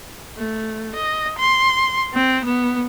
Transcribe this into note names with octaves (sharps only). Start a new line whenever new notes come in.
A3
D#5
C6
C4
B3